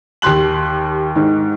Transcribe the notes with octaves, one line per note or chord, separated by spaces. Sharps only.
D#2 G4 C6 F#6 F#7
G#2 D#3